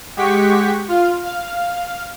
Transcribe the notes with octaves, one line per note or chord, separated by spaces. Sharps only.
G#3 G4 F#5 G5 C#6 B6
F4 F5
F5